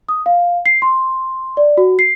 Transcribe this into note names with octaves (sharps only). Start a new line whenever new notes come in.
D#6
F5
C7
C6
D5
F#4
C7